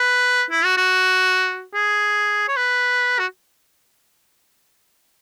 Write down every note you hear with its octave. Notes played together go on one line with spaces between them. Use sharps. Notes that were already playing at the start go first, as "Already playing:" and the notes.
Already playing: B4
E4
F#4
F#4
G#4
C#5
B4
F#4